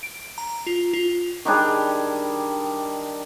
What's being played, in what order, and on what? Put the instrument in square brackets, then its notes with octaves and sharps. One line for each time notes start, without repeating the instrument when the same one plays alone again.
[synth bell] D7
A#5
F4
F4
[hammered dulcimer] D#3 G3 D4 G#4